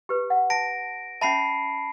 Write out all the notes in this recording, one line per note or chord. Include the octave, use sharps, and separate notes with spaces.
G4 B4
F#5
A5 A#6 D7
C#4 E5 A5 B5 C7